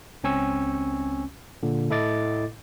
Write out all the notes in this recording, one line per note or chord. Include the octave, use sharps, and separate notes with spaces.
C#2 C4 C#4 G#5 C#6 E6
A#2 D3
A2 E4 A4 D#5 D6 A6